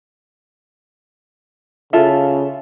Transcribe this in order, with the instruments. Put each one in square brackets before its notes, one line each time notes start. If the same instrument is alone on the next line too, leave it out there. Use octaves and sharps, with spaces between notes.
[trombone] C#3 [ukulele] F4 A4 E5